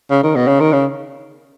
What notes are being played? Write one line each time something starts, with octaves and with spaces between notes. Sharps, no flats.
C#3
D#3
B2
C#3
D#3
C#3